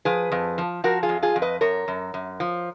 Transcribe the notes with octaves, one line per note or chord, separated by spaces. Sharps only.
F3 G#4 B4
F2
F3
F3 F#4 A#4
F4 G#4
F2
F4 G#4
F2
B4 D#5
F#2 A#4 C#5
F#2
F#2
F3